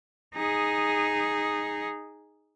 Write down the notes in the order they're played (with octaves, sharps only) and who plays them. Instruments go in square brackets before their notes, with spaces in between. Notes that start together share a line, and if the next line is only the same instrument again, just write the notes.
[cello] D#4 G#4